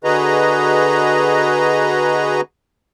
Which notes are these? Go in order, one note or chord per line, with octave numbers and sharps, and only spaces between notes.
D3 F#4 G#4 B4 D#5 A#5